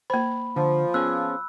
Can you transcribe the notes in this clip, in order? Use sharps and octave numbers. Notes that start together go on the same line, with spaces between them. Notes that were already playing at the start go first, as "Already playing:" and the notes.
A#3 C5 B5
D3 F3
B3 C#4 G#4 E6 F#6